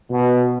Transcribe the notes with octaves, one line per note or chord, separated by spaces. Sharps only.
B2